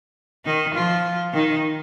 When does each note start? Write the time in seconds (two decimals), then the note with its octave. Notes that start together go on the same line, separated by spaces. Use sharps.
0.45 D#3 D#4
0.75 F3 F4
1.33 D#3 D#4